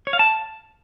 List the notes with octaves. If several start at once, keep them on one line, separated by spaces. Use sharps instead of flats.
C#5
F5
A5